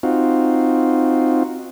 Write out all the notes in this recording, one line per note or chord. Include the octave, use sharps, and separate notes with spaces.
C4 D#4 F4 F#4